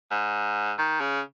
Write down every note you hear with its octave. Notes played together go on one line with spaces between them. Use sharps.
G#2
D#3
C#3